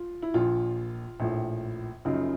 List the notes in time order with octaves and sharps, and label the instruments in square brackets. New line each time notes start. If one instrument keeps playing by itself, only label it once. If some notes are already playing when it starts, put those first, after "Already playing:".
Already playing: [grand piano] F4
E4
A#1 A#2 F3 F4
A#1 A2 F3
F#1 F#2 C#3 F3 D#4